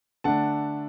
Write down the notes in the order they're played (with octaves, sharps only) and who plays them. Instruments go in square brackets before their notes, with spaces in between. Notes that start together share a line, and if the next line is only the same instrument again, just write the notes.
[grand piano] D3 A3 D4 F#5 A5